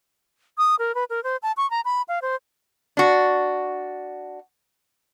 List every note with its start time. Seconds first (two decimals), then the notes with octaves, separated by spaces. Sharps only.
0.58 D#6
0.79 A#4
0.95 B4
1.10 A#4
1.24 C5
1.43 A5
1.57 C#6
1.71 A#5
1.85 B5
2.08 F5
2.22 C5
2.97 D4 F#4